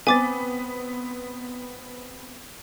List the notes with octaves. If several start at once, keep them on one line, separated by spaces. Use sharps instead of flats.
B3 C4 G#5 D6 A6